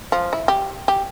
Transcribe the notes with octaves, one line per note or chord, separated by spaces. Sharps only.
F3
E4
G4
G4